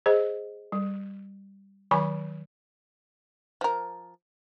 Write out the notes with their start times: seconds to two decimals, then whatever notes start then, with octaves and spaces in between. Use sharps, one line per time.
0.06 G#4 C5 D#5
0.72 G3
1.91 D#3 F#3 G#5 B5 C#6
3.61 F3 A#4